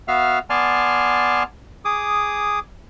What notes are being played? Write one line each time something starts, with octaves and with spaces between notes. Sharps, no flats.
B3 F#4 E5 F5 F6
B3 D5 G#5 A5 C6 F6
G#4 D6 D#6